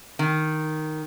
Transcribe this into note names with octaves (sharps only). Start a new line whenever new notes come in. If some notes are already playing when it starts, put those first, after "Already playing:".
D#3